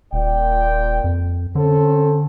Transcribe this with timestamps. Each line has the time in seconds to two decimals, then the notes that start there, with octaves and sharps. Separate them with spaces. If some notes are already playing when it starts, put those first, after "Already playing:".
0.13 D#1 A#2 D5 G5
1.04 F2
1.55 D3 C4 C#4 A4